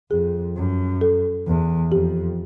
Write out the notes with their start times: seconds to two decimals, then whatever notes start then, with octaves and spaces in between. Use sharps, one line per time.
0.11 F2 G#4
0.56 F#2
1.01 A4
1.47 E2
1.92 F2 G4